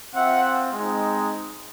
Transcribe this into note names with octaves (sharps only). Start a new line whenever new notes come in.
C4 F4 E5 F#5
G#3 C4 D#4